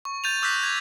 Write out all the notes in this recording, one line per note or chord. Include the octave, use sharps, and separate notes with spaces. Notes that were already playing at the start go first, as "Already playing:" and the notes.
C#6
G6 A6 D#7 F7
D6 E6 F#6 G6 A#6 B6
G#6